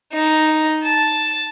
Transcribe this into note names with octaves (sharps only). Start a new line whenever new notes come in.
D#4
A5